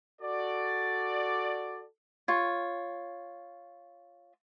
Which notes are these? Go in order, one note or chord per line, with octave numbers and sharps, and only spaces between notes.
F#4 A4 D5
F4 C#5